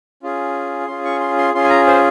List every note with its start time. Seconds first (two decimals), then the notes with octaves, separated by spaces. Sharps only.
0.23 C#4 F4 G#4
0.87 C#4 F4 G#4 C6
1.05 C#6
1.20 C6
1.38 C6
1.54 C#4 F4 G#4 C6
1.64 G#5
1.70 A#5
1.87 C5